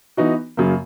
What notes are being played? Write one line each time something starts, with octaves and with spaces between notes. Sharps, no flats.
E3 B3 D#4 F#4
F#2 C#3 F#3 A#3